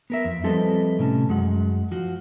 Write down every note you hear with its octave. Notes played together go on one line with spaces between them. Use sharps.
B3 A#4 E5
F2
F3 G3 C4 A4 B4 D#5
A2 C3 C#4 A5
F#2 G#3 F#5
F3 F#4